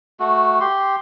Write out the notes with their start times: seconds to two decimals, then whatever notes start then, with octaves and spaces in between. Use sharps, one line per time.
0.20 A3 F#4
0.60 G4 C6